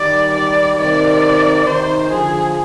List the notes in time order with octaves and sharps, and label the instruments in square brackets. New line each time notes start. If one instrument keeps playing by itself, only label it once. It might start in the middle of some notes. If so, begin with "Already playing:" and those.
Already playing: [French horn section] D#3 G3 [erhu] D5
[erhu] D5
[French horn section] C3 D#3 [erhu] D5
[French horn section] C3 D#3 [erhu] C5
[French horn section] D3 F3 [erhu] G#4